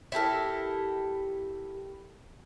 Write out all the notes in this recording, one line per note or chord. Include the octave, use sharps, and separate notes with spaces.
E4 G4 A4 A#4